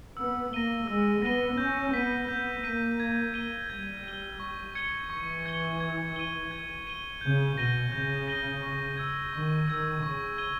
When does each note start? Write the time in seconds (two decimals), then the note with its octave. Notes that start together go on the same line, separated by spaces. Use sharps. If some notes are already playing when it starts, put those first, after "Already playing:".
0.17 B3 E6
0.53 A#3 A#6 D#7 G7
0.87 G#3 E6
1.22 B3 A#6 D#7 G7
1.58 C#4 G6
1.93 B3 B6 D#7
2.29 B3 G6
2.64 A#3 B6 D#7
3.00 G#6
3.34 D#7 G7
3.69 G3 G#6
4.04 D#7 G7
4.40 C#6
4.75 G#6 C#7 G7
5.10 E3 C#6
5.46 G#6 C#7 G7
5.80 G#6
6.16 D#7 G7
6.51 G#6
6.87 D#7 G7
7.21 C#3 G6
7.56 B2 A#6 D#7 G7
7.92 C#3 G6
8.27 A#6 D#7 G7
8.63 C#6
8.97 E6 G#6
9.33 D#3 C#6
9.68 D#3 E6 G#6
10.03 C#3 C#6
10.38 G#6 D#7 G7